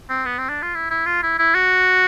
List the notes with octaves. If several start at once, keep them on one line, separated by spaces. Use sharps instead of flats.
C4
B3
C4
D4
F4
E4
E4
F4
E4
E4
F#4